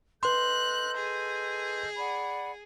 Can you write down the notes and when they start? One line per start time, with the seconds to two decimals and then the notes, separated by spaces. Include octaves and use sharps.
0.23 A4 B4 D#5 C6 F#6 G6
0.97 G#4
1.97 D5 F#5 B5